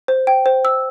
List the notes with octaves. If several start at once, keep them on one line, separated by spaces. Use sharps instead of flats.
C5
G5
C5
E6